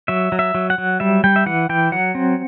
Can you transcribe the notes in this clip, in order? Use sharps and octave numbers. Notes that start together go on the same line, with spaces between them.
F#3 E5
F#3
E5
F#3
F#5
F#3
G3 E5
G3 G5
E5
E3 F#5
E3 G5
F#3 F#5
C4